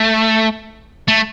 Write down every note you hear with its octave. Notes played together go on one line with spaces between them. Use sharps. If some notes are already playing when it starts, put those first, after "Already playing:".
Already playing: A3
A3